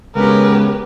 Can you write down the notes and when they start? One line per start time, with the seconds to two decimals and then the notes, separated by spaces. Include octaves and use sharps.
0.15 C#3 G#3 B3 C#4 G4 A#4 B4